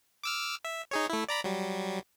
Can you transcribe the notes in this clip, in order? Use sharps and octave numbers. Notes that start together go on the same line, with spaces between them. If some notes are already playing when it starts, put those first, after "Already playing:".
D6 E6 F6
E5
D#4 G#4 C#5
A3 E4
D5 A#5 B5
F#3 G3